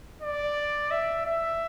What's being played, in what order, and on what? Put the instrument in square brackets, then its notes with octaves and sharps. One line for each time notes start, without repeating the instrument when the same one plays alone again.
[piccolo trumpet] D5
E5
E5